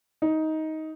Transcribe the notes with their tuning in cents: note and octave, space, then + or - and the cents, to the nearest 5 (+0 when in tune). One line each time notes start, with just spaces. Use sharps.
D#4 +15